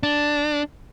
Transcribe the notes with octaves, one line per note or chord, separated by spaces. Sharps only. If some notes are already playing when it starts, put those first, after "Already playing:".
D4